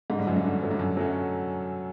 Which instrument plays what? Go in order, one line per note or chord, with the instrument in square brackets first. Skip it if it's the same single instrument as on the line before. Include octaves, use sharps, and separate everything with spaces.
[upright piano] G#2 [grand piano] D3
[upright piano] G2
[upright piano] F#2 [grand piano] F#3 A3 C#4
[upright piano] G2
[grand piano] D3
F#3 A3 C#4
[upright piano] G2
[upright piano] F#2 [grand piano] D3
[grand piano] F#3 A3 C#4